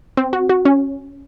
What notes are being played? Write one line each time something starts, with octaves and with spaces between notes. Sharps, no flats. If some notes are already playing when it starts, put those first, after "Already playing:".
C4
F#4
F#4
C#4